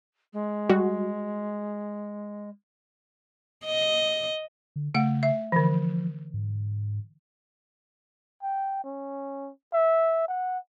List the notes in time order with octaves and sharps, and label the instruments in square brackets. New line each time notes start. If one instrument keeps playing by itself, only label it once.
[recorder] G#3
[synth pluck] G3 F#4
[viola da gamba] D#5
[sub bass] D3
[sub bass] C#3 [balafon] A3 F#5
[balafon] E5
[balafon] D3 E3 [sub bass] F3
[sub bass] G#2
[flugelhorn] G5
C#4
E5
F#5